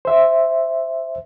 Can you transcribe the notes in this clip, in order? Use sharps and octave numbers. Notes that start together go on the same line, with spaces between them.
C5 E5